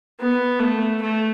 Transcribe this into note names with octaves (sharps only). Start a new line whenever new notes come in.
B3
A3
A3